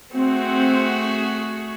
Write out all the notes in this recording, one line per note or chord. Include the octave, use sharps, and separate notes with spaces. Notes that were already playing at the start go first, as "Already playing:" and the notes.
A3 C4 F#4 G#4 F#5